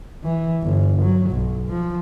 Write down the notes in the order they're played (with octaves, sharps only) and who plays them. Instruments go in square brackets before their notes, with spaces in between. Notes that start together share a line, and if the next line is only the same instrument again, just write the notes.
[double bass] E3
G1
F#3
B1
F3